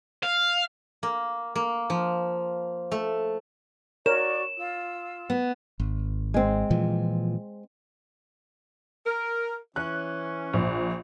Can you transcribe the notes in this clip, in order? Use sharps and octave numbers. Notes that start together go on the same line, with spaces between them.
F5
A#3
A#3
F3
A3
F#4 A#4 C#5 D5 C#6 E7
F4 E6
B3
G#1
G#3 C4
A#2 E3 F3
A#4
E3 C#4 F#6
A#1